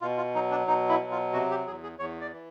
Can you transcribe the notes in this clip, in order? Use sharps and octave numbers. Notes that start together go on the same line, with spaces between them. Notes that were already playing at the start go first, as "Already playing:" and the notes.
B2 F4
F4
F#3 D#4
D4
B2 D#4
E4
F#3
F4
C3 F#4
G4
E2 G#4
G#4
E2 C#5
D5
E3